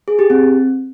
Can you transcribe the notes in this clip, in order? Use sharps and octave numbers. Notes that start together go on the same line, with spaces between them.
G#4
G4
C4